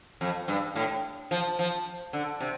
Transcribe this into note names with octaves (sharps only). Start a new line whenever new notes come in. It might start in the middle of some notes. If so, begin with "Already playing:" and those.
F2
G2
A2
F3
F3
D3
C3